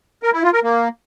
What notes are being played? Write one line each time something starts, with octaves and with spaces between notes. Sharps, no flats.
A#4
E4
F4
A#4
A#3